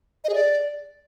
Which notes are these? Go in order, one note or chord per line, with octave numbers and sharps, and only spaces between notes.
D#5
G#4
D5